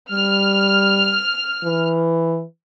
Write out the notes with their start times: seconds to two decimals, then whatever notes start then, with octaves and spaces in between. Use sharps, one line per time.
0.12 G3 F6
1.64 E3